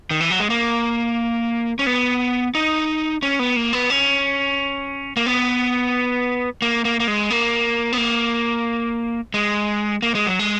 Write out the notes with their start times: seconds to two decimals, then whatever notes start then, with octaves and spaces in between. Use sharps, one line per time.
0.11 D#3
0.21 E3
0.30 F#3
0.40 G#3
0.50 A#3
1.79 C#4
1.87 B3
2.55 D#4
3.23 C#4
3.39 B3
3.56 A#3
3.73 B3
3.90 C#4
5.17 A#3
5.26 B3
6.62 A#3
6.85 A#3
7.00 A#3
7.08 G#3
7.30 A#3
7.93 B3
7.97 A#3
9.34 G#3
10.02 A#3
10.15 G#3
10.27 F#3
10.39 G#3